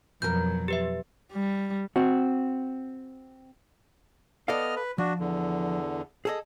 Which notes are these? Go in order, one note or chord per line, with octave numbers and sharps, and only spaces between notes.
F2 B2 F#3 A#4 G6
G4 B4 E5
G3
C4 F#4
B3 A4 D5 D#5 F5 F6
B4
F3 D4 F#4
E2 D3
G#4 A4 D#5